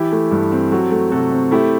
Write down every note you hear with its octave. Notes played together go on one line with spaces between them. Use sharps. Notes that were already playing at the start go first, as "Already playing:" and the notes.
Already playing: E3 E4 G4
A3
G2
C4
F#3 F#4 A4
A3
C3 F#4 A4
C4
A3 E4 G4